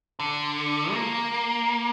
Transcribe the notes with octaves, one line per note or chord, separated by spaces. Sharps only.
D3
A#3